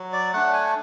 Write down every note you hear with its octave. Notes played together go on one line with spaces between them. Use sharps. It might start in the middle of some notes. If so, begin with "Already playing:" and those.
Already playing: F#3
D5
A3 D4 F#5
G#5